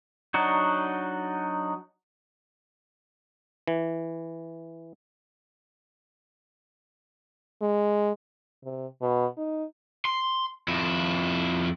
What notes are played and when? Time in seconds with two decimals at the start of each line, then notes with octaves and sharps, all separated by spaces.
0.34 F#3 D4 D#4 F#4
3.68 E3
7.62 G#3
8.64 C3
9.01 B2
9.37 D#4
10.05 C6
10.68 F2 E4